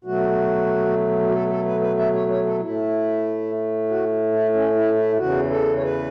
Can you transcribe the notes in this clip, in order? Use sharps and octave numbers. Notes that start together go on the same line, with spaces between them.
B2 F#3 A3 F#4
F#4
A4
A4
B4
B4
E5
C#5
C#5
A4
A2 A3 E4
F#4
E4
C#4
E4
E4
E2 C#3 E3 F#4
A4
C#5
B4